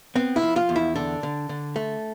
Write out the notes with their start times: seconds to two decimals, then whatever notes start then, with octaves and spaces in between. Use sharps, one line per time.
0.15 B3 C4
0.36 E4
0.42 F3
0.56 F4
0.69 E2
0.76 E4
0.96 D3 D4
1.23 D3
1.49 D3
1.76 A3